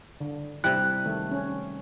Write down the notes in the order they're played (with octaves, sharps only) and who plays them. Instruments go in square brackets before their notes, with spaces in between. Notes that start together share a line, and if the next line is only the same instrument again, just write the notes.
[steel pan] D3
[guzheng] C3 G3 [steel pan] E4 [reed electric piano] F#6
[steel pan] D#3 A3
C#4